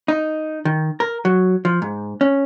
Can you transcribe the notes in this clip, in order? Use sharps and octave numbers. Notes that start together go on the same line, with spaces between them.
D#4
D#3
A#4
F#3
F3
G#2
C#4